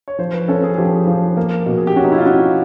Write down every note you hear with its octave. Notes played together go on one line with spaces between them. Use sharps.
C#5
F3 C5
B4
C#4 A4
G#4
G#4
F3 G4
F3
A#3
B2
G#4
G4
C#4 F#4
D#4
E4
F4
C#4 F#4